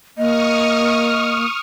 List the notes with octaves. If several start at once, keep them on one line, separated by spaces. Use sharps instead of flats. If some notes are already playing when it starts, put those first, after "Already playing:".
A#3 D#5 C#6 D#6 F6